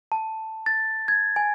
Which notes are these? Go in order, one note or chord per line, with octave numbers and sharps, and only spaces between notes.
A5
A6
G#6
G#5